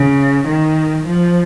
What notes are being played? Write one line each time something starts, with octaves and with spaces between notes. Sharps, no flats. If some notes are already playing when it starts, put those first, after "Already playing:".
Already playing: C#3
D#3
F3